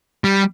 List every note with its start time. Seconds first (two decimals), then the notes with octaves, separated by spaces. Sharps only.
0.24 G3